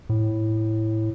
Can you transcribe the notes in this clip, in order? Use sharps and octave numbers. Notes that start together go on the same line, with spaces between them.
A2